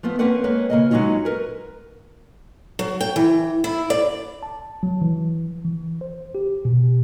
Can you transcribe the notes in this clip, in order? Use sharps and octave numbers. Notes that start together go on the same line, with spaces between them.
F3 A3 B3 F4
A#3 C4 C#4 A#4 B4 F#5
G#3 A#3 B4 C#5
C#3 A#3 D#5
F#3 G#3 C#4 D#4 F4 F#4
A#4 B4
F#3
G5
E3
E4
D5
A5
F#3
E3
E3
C5
G4
B2